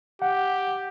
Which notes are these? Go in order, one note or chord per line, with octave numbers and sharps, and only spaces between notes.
G4 F#5